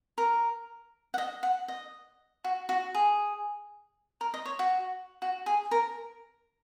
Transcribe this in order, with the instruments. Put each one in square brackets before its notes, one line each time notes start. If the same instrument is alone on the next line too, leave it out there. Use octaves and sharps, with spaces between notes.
[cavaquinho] A#4
F#5
D#5
F#5
D#5
F#4
F#4
G#4
A#4
D#5
C#5
F#4
F#4
G#4
A#4